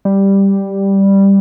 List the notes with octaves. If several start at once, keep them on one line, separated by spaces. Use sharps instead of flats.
G3